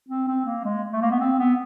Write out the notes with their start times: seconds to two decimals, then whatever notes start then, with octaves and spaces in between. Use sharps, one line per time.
0.09 C4
0.28 C4
0.45 A#3
0.64 G#3
0.92 A3
1.02 A#3
1.11 B3
1.20 C4
1.39 B3